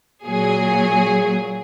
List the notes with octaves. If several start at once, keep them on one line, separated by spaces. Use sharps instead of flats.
A#2 F#3 G#4